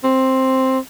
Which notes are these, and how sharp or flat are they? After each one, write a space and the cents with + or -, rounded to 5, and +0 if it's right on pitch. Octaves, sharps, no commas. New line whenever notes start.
C4 +5